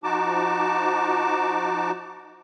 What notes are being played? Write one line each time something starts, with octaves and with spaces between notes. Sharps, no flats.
F3 D#4 F#4 A5 D6